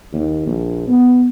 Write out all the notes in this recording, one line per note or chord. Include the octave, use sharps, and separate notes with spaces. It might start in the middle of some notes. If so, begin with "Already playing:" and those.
D#2
A#1
B3